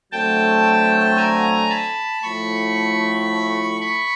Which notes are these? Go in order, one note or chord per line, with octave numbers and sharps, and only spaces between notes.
D3 F#3 A3 C4 G5 A5
G#5 A#5
A5 B5
A2 F3 A3 B5 C#6
B5 C#6